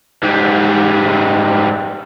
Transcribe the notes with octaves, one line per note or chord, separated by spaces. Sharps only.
G#2 G3